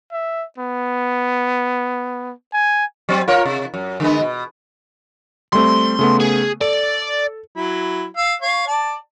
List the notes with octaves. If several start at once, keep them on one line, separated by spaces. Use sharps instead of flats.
E5
B3
G#5
F#3 C4
F4 A#4 C#5
C3
F#2
D3 G#3 B3
B2
G3 A3 C4 C6
C#3 A3 B3
G#4
A4 D5
F#3 E4
F5 E6
C#5 F5
D5 A5